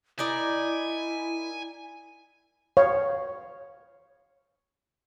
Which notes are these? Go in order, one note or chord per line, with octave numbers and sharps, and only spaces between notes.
D#4 E4 A#4 D5 G#5
C#5 F5